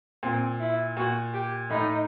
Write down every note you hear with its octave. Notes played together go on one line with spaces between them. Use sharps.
A#2 C4
E4
A#2 F#4
G4
A2 D#4